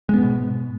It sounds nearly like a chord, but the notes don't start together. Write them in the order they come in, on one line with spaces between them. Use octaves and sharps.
G#3 B3 G#2 B2